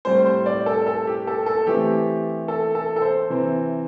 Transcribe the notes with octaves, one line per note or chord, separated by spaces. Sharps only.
A2 G3 C4 C5
C5
D5
A4
A4
G4
A4
A4
E3 A3 C4 G4
A4
A4
A4
C5
C3 E3 C4